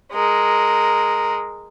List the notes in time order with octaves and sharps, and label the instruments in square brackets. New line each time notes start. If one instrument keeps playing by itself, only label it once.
[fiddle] G#3 A#4